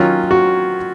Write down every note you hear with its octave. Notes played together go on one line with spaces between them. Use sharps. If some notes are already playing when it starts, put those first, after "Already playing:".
Already playing: D#3 F#3 C#4 F4
F#4